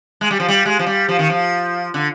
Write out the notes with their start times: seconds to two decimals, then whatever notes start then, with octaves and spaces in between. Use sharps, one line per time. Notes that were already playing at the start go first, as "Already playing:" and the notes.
0.21 G#3
0.31 G3
0.40 F3
0.48 G3
0.66 G#3
0.79 F3
0.86 G3
1.08 F3
1.19 D#3
1.30 F3
1.94 D3